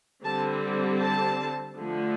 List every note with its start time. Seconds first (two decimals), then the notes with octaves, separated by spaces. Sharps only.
0.24 D3 G3 C4 A5
1.01 A5
1.77 D3 F3 A3